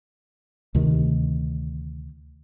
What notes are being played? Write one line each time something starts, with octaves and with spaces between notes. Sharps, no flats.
D2 C3 D#3